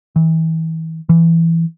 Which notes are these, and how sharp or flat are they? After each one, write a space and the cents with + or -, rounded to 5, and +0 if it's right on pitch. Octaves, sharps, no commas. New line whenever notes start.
E3 -35
E3 +10